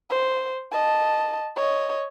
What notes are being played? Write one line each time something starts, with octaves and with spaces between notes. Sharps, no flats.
C5
D#5 A5
C#5 D#5